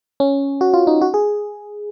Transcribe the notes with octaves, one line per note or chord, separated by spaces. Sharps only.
C#4
F#4
F4
D#4
F#4
G#4